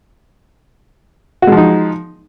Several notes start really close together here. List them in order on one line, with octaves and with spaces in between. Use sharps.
F#4 G#3 F3 D#4